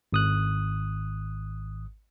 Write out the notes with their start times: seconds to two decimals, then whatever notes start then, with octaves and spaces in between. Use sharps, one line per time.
0.13 G#1 D#6 F#6